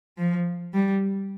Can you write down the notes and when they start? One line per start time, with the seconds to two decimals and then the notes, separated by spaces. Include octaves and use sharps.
0.18 F3
0.74 G3